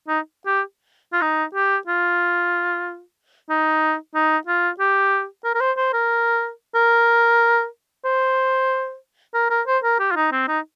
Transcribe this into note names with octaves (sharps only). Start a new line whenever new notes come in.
D#4
G4
F4
D#4
G4
F4
D#4
D#4
F4
G4
A#4
A#4
C5
C5
A#4
A#4
C5
A#4
A#4
C5
A#4
G4
F4
D#4
C4
D#4